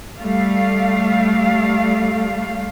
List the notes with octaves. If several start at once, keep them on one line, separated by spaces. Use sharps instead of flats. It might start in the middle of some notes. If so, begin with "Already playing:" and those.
G3 A3 F5